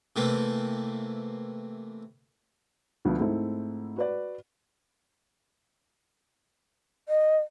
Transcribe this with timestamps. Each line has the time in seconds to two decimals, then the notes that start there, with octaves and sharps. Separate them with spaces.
0.16 C3 E3 A3 A#3
3.05 D2 D3 F3 B3
3.19 G#2 A3 C4 E4
3.96 F#4 B4 D5
7.09 D#5